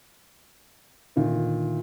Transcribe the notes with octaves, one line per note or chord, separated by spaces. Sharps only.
D2 A#2 D#3